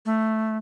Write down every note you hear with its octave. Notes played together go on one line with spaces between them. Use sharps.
A3